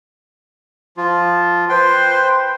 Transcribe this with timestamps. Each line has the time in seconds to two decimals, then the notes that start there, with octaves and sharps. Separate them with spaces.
0.97 F3 F4
1.69 B4 C5 G5 C6